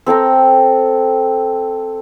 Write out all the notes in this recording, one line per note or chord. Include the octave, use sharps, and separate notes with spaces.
C4 A4 G5 A#5